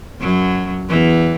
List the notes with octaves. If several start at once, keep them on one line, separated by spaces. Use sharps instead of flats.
F#2 F#3
E2 E3